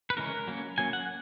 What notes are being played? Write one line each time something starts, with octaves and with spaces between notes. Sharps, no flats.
B4
C#3 E3 G#3 C#4 A#4
F#3 A#3 C#4
F#3 A#3 C#4 G#5
F#5